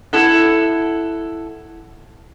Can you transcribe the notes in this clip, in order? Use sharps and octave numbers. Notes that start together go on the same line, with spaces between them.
E4 A4 F#5